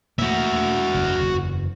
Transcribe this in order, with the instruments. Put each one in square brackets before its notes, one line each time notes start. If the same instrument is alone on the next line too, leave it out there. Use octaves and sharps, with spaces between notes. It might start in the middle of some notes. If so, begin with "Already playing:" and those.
[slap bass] A3 A#3 [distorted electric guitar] F#4 E5
[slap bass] F#1
F#1 E2